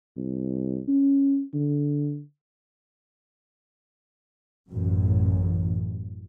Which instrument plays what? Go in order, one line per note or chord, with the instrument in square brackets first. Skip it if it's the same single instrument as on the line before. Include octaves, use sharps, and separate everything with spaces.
[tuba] C2
C#4
D3
[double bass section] A1 F#2